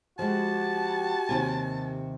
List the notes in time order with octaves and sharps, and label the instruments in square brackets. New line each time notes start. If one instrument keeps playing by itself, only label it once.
[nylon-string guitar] F3 G#3 [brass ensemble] F#4 G4 [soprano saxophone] A5
[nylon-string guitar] D#2 C3 G#5